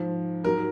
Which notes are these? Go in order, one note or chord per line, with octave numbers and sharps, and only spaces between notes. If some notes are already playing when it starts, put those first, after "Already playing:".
Already playing: G#2 F3
G#2 F#3 A#4